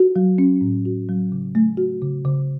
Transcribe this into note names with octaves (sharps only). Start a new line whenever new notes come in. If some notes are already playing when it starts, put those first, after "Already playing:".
Already playing: F#4
F#3
C#4
A2
F#4
F#3
C#3
A3
F#4
C#3
C#3